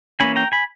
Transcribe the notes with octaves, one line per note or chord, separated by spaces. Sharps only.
E3 A#3 C#4 G#5 B5
G5 A#5
G#5 B5